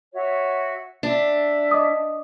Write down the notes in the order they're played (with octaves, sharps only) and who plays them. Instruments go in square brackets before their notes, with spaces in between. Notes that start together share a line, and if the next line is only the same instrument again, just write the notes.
[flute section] F#4 C#5 E5
[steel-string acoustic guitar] D4 [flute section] E5
[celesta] D#5 D6 D#6